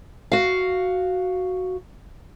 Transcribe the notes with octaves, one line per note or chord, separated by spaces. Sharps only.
F#4 F5